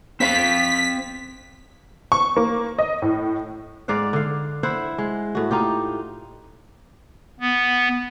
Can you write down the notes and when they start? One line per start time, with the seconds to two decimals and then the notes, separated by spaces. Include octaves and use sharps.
0.20 C4 C5 F5 B6
2.12 C#6
2.37 A#3
2.79 D#5
3.02 A2
3.88 G#2 D5 F5 F#5
4.13 D3 F5
4.63 E4 C5 F#5
4.98 G#3
5.35 A2 F#4
5.51 D#4 F4 G4
7.40 B3